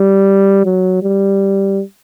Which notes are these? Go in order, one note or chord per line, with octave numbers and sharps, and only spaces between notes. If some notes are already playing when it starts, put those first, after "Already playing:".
Already playing: G3
F#3
G3